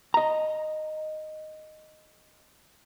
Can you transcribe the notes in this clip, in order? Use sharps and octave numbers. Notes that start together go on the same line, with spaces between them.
D#5 A#5